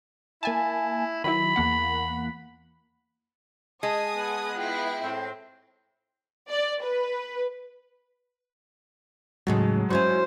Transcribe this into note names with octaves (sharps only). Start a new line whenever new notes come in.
A#3 E4 G#5 A5
D#3 F#3 E4 B5
E2 A#3 F#5
G#3 G#5 A5 D#6
B3
E4 F4 G5
A2 C4
D5
B4
D#2 A2 C#3 F#3 G#3
C#4 E4 F#4 C5